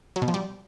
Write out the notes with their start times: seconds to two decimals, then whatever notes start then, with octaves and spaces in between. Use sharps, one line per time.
0.16 F#3
0.22 B2
0.28 F3
0.34 G3